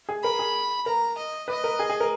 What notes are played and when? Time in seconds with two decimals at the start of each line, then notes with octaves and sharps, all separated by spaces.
0.09 G#4
0.24 A#4 B5
0.39 G#4
0.86 A#4 A#5
1.18 D#5
1.48 B4 D#5
1.64 A#4
1.79 G#4
1.90 G#4
2.00 A#4